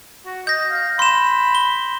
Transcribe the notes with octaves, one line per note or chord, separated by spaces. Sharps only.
F#4
D#5 G6 A#6
F5
B5 C6 E7
G7